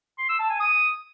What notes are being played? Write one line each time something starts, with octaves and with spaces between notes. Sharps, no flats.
C6
E6
A5
G#5
D#6